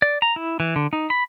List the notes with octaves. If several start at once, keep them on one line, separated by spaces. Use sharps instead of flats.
D5
A#5
E4
E3
D3
D#4
B5